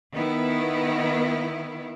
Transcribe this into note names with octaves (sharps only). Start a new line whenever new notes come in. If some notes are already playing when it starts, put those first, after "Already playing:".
D#3 B3 E4